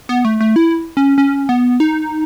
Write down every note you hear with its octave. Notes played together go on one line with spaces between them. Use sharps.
B3
A3
A3
E4
C#4
C#4
B3
D#4